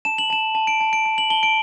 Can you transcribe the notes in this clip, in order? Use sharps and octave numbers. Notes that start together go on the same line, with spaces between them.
A5 E7
F#7
A5 E7
A5
D7
A5
D7
A5
F#7
A5 G7
D7